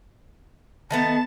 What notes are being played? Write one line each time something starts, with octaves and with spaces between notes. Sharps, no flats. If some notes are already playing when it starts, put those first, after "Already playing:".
D#3 A3 B3 A5